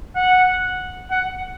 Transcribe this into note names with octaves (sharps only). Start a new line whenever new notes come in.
F#5
F#5